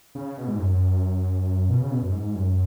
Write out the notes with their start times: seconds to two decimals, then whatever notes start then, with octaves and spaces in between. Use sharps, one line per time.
0.15 C#3
0.37 B2
0.48 G#2
0.59 F#2
0.69 F#2
1.69 B2
1.80 C#3
1.91 B2
2.02 F#2
2.12 G#2
2.35 F#2